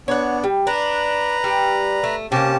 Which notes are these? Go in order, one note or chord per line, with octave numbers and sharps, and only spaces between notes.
B3 D4 C#5 F#5
G3
D4 B4 A#5
G3
A3
C3 A#3 C#4 G4 A5